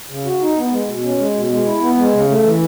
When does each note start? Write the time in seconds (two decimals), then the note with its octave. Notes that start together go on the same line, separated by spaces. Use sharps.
0.09 C#3
0.25 F#4
0.41 D#4
0.57 B3
0.71 G#3
0.88 B2
1.03 C#4
1.19 G#3
1.35 B2
1.49 G#3
1.66 E4
1.81 B3
1.97 G#3
2.12 C#3
2.28 A3
2.43 E3